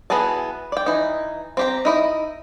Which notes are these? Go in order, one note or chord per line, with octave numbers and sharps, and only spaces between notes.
E3 B3 F#4 G#4 A5
D5 G5
E3 D#4
C4 G4 A#5
D#4 E4 D#5